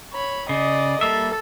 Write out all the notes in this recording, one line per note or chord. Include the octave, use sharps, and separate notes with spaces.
C#5 B5
C#3 D5 D#5
G3 A#3 A4 E5